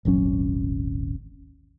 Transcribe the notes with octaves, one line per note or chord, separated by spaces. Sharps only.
D#1 G#1 F#3 C#4